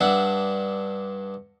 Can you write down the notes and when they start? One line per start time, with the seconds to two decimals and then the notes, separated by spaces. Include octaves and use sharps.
0.01 G2 D4 E5 F#5